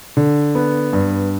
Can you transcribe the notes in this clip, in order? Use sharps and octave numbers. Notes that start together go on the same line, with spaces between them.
D3
B3
G2